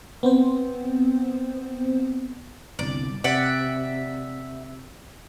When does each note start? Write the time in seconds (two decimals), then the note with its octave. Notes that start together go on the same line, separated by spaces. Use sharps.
0.23 B3 C4 C5
2.79 G1 C2 D5
3.24 C3 D5 E5 F#5